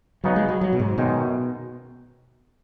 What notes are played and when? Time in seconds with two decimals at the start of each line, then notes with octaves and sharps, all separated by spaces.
0.24 C#3 F#3 B3 D#4
0.36 G#3
0.48 F#3
0.61 F#3
0.73 B2
0.79 G#2
0.98 F#2 B2 D#3 G#3 D#4